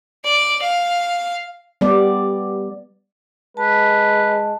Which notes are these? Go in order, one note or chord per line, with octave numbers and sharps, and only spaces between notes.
D5
F5
G3 B3 D5
G#3 B4 A5